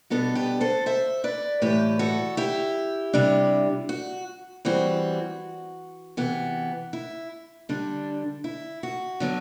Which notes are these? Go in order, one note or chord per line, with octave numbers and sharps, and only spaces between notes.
B2 G3 B3 D4 F#4 A4
G4 B4
A4 C5
C5 E5
B4 D5
A2 E3 G3 G4 B4
F#4 A4
E4 G4
C3 G3 D4
F#4
E3 G3 C4 F#4
C3 E3 B3
E4
D3 G3 D4
E4
F#4
D3 F#3 B3